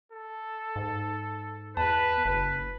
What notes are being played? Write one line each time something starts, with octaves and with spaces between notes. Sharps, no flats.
A4
G#2
E2 B4 A5
F#1 B4